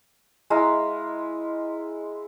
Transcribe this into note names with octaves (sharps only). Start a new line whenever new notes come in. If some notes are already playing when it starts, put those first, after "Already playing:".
G#3 E4 F5 A#5